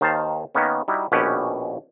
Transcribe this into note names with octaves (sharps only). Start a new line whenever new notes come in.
D#2 D#3 C5 F5 A5
D#3 A#3 B3 C#4
G3 D#4 E4 F#4
A#1 D#2 B2 C#4 G4 B4